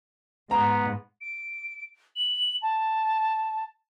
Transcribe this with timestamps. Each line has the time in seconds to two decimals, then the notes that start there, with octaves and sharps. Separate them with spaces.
0.51 G#2 B3 A#5
1.21 D7
2.16 F#7
2.62 A5